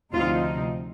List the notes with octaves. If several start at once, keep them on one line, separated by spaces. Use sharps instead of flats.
D2 C3 F3 C4 D#4 F4